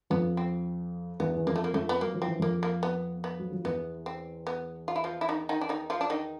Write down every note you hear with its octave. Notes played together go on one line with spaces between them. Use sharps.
F2 F3 B3
C4
E2 E3 B3
E3
F2 F3 A#3
A3
A#3
F2 F3 A3
B3
F#3 A#3
F3
E3 C4
F2 F3 A#3
A#3
B3
B3
F#3
F3
E2 E3 B3
C4
B3
F4
E4
F3 F4
E4
D#3 D#4
D#3 D#4
D4
D#3 D#4
F3 F4
D4
D#3 D#4